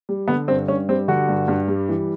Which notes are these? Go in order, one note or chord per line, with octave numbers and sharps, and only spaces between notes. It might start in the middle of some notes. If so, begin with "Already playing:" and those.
G3
D3 B3
G2 C4
G2 C#4
G3 C4
D3 F#4
G2
G2
G3
E3